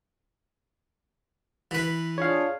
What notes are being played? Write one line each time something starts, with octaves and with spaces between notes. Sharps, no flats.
E3 B4
D4 F4 G#4 C#5 F5